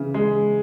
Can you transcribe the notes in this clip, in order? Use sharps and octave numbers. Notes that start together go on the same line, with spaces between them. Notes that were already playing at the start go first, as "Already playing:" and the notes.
Already playing: C#3 E3
G#3